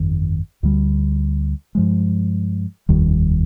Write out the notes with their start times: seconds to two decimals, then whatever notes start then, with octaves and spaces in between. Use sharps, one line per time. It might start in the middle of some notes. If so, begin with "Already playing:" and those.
Already playing: G1 F2 D#3
0.63 D2 D3 G3
1.75 G2 F3 G#3
2.89 F1 D#2 D#3 G3